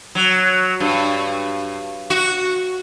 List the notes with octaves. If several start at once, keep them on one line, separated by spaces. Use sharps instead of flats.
F#3
G2
F#4